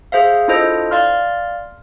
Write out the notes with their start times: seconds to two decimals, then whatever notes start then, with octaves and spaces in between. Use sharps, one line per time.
0.12 G#4 C5 E5 F5
0.48 D4 E4 F4 A4 C5 D#5
0.91 D5 F5 C6 F6